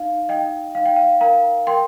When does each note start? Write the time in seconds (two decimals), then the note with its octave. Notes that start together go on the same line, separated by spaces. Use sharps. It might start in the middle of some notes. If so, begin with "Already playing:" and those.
Already playing: D#4 F5
0.29 D#4 D#5 G5
0.75 D#4 F5
0.86 G5
0.96 F5
1.21 A#4 F5 A#5
1.67 A#4 G5 C6